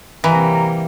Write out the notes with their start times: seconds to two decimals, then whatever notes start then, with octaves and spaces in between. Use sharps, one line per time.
0.24 C3 E3 G3 A#3 A#5